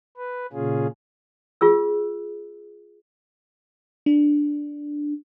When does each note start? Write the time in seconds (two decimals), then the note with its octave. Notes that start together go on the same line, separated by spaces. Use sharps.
0.18 B4
0.53 A#2 C#3 C#4 F4 G#4
1.61 F4 G#4 E6
4.06 D4